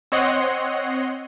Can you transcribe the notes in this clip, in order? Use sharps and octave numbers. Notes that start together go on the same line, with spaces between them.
C4 C#5 D#5 F#5 C6